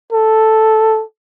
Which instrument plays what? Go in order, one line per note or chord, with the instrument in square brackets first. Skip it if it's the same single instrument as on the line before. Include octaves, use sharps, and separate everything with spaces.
[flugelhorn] A4